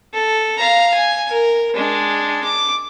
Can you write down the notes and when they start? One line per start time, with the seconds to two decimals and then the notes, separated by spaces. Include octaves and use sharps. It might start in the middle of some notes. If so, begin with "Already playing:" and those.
0.14 A4
0.58 F5 A#5
0.95 G#5
1.29 A#4
1.75 G#3 D4
2.44 D6